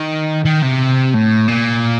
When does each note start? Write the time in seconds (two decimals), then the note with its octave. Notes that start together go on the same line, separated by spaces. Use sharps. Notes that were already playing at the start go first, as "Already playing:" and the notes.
Already playing: D#3
0.45 D#3
0.62 C3
1.14 A2
1.48 A#2